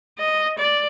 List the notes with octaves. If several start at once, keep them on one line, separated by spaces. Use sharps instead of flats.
D#5
D5